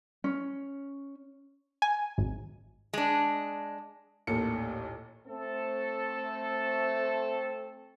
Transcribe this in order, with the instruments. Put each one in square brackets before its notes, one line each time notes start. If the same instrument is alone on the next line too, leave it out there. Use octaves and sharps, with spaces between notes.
[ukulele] C#4
[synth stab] G#5
G#1
[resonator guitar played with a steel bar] G#3 D4
[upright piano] A1 D#2 A#2 A4 C#7
[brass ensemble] A3 C4 A4